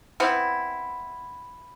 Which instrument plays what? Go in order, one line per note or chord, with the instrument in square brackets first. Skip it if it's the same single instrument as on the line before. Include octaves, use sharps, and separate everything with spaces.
[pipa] B3 C4 E4